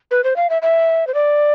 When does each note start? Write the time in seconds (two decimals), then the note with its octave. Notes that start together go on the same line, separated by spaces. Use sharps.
0.11 B4
0.24 C5
0.36 F5
0.50 E5
0.62 E5
1.07 C5
1.14 D5